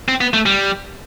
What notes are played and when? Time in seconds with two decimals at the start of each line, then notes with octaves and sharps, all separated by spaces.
0.08 C4
0.21 B3
0.34 A3
0.46 G3